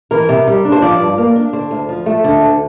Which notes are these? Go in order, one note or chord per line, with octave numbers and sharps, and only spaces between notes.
E3 A#4
C3
G3
D4
C5
F3 D5
G2
A#3
D4
D3 C5
D2
F3
A3
D3
D2